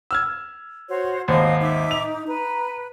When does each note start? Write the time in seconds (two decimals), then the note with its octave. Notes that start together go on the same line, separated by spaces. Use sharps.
0.11 E6 F6 G#6
0.89 F#4 C5 C#5
1.28 G#1 D#2 C5 D#5 F5 D#6
1.60 D#4 E5 D6 E6
1.91 F7
2.28 B4 A#5